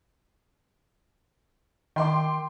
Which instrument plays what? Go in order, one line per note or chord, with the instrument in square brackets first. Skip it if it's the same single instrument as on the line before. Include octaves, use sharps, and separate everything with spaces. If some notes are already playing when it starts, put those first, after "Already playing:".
[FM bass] D#3 [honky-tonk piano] G5 C6 D6